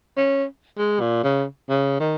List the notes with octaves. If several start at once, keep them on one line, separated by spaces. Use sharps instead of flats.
C#4
G#3
A#2
C#3
C#3
D#3